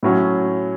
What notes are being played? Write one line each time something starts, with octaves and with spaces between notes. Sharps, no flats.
A2 F#3 C#4